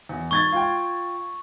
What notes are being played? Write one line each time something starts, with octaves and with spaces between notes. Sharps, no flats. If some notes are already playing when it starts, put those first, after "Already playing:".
E2
G#2 C#6 G#6 A6
F4 G5